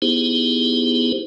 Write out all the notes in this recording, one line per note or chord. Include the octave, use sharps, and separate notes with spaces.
B3 D#4 E4 G4 G#4 C5